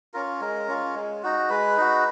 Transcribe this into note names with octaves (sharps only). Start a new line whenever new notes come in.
C#4 F4 A#4
G#3 A#4
C#4 F4
G#3
D#4 F#4
G#3 B4
D#4 F#4